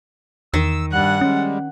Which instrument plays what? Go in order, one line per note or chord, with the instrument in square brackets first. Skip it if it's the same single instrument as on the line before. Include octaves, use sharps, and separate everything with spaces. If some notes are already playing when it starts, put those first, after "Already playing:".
[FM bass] E2 [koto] D#3 [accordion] E6
[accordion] G2 G3 F#6 [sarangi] F#5
[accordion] G3 G#3 [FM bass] C#4